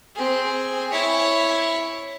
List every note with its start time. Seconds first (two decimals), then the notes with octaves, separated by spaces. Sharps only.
0.15 C4 G#4
0.92 E4 C#5